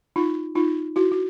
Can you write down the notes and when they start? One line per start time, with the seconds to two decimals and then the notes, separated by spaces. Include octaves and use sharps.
0.16 D#4 F4
0.55 D#4 F4
0.96 E4 F#4
1.12 F#4